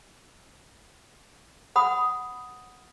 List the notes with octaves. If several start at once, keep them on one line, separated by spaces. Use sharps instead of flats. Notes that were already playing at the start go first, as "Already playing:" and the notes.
F#5 B5 D#6